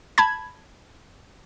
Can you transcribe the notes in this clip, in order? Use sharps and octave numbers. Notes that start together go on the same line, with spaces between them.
A5 B5 G#6